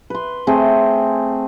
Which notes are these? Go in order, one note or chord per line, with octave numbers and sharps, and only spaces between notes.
B4 C6
A3 C4 G#4